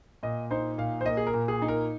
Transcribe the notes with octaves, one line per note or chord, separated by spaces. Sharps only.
A#2 D#5
D#4 C5
A#2 F5
C5
A#3 D#5
G#4
A#4
A#2
G#4
D#4
A#4